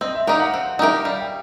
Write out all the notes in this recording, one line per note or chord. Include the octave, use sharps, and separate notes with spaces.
C4 D#5
E5
D#4 G4 A#4 F5
F#5
C4 F#5
D#4 G4 A#4 E5
G3 F5
G5